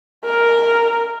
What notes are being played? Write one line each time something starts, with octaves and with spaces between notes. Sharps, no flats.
A#4